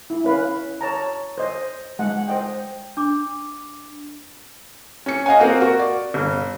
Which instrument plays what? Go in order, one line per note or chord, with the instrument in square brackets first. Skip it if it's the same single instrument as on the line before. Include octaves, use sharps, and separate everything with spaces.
[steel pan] E4
C#4 B4 F5
C#5 A5 A#5
C5 D#5
G#3 F#5
C5 D#5 G5
[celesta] D4 D6
[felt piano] C#4 C#7
D#5 F5 F#5 G#5
A#3 C4 F4 F#4
F#4 A#4 C#6
D5
G1